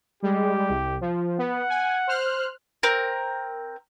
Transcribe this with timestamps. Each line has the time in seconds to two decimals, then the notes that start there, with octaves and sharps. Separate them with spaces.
0.23 G3 G#3 G4
0.69 C2
1.01 F3
1.38 B3 F#5
1.69 G#5
2.07 C5 F6 F#6
2.83 C4 A#4